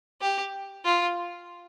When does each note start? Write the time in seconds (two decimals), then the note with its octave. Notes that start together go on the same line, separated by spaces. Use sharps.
0.21 G4
0.85 F4